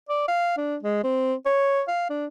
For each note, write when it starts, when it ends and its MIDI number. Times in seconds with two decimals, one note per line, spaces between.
0.09 0.24 74
0.28 0.53 77
0.57 0.77 62
0.83 1.02 56
1.04 1.34 60
1.46 1.82 73
1.88 2.07 77
2.10 2.26 62